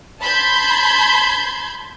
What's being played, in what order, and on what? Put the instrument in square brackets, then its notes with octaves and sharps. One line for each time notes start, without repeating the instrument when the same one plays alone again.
[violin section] A5 B5 C6 G6 G#6